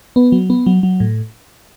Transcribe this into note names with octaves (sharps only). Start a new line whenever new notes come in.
B3
F#3
B3
F#3
F#3
A2